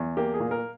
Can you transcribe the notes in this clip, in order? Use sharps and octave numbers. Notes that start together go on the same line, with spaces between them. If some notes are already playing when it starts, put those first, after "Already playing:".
Already playing: E2
A#3 G4
G#4
A#2
A#4